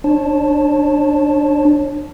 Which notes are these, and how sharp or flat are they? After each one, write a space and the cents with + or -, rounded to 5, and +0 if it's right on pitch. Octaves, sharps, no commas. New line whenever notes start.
D4 +15 C#5 -30 A5 +0